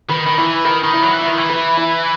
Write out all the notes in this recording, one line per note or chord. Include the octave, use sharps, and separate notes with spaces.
D#3 B4
D#3
E3 E4
D#3 B4
D#3
E4
F#3
E3
E4
D#3
E3
B4
E4